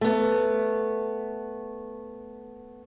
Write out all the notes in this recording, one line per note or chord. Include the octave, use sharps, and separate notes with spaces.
A3 B3